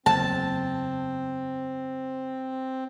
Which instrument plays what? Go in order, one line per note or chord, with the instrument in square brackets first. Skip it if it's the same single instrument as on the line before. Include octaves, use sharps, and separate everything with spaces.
[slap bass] F#1 E2 [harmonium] C4 [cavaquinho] A5